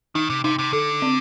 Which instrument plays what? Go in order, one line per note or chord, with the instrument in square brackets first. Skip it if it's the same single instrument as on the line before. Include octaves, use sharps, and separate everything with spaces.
[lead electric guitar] D#3 [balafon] D#4
[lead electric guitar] C3
[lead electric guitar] C3 [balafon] D#4
[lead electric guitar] C3
[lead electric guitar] D3 [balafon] A4
[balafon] C4